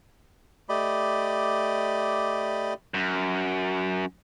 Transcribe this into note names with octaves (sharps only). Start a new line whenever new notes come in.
A3 G4 D5 D#5 B5
F#2